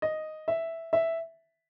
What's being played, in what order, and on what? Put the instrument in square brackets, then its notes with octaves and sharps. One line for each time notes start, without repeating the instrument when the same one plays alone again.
[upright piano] D#5
E5
E5